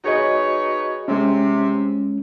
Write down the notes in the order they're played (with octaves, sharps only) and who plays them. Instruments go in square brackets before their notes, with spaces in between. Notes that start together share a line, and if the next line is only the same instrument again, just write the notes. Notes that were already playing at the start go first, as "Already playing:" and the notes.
[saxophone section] D#4 B4 C#5 [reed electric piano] F#4 G#4 D#5
[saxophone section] C3 [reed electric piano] G#3 C#4